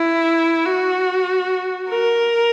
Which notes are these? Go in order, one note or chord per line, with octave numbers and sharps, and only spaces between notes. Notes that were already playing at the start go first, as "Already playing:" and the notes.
Already playing: E4
F#4
A#4